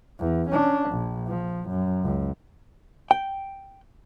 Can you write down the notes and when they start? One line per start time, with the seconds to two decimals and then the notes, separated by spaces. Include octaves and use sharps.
0.19 E2
0.49 C#4 D4
0.90 A#1
1.28 F3
1.69 F#2
2.03 C#2
3.11 G5